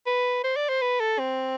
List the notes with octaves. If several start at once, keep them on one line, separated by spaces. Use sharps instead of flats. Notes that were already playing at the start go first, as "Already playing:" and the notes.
B4
C5
D5
C5
B4
A4
C4